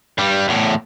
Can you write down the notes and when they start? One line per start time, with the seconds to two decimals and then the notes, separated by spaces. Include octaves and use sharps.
0.18 G2 G3
0.48 E2 A2